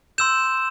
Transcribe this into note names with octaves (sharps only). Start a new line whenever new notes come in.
C6 E6 G6 E7